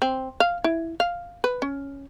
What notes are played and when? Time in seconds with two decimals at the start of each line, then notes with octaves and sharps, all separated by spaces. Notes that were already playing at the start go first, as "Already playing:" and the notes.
0.02 C4
0.40 F5
0.64 E4
1.00 F5
1.44 B4
1.62 C#4